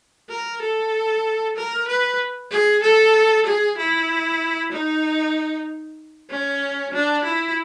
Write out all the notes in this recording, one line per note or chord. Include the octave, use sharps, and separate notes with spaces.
A#4
A4
A#4
B4
G#4
A4
G#4
E4
D#4
C#4
D4
E4